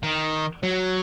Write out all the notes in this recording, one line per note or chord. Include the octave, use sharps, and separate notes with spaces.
D#3
F#3